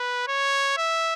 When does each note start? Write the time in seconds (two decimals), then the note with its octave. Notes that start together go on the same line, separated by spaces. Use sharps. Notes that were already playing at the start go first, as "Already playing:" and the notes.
Already playing: B4
0.28 C#5
0.77 E5